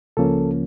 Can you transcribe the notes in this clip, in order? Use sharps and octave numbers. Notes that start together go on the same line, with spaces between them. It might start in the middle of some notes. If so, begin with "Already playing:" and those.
C#2 C#3 F3 A#3 C#4 A4